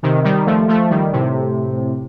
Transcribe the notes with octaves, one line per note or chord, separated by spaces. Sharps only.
C3 D#3
D#3 G3
F3 A3
F3 A3
D#3 G3
A2 C3